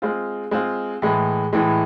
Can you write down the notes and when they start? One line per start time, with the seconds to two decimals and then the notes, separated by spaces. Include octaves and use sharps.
0.02 G#3 C4 F4
0.51 G#3 C4 F4
1.02 A2 E3 G#3
1.53 A2 E3 G#3